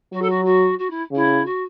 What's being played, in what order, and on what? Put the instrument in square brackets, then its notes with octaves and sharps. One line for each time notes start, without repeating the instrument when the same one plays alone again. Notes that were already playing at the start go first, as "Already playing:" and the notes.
[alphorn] F#3 [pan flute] F#4
[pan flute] A4
F#4
F#4
F#4
E4
[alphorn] C#3 [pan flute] E4
[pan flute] F#4